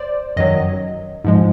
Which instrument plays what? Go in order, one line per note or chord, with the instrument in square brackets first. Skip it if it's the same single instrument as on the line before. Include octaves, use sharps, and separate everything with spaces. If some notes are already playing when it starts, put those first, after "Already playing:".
Already playing: [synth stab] C5 D5
F#2 D#3 F#3 D#5
G#2 F3 G#3